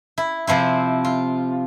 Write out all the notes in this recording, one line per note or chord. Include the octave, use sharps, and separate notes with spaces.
E4
C3 F3 C4 E4
F4